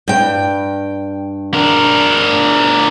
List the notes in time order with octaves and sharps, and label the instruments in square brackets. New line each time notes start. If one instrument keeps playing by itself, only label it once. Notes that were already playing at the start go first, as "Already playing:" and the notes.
[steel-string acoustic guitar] G2 G5
[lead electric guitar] D4 A#4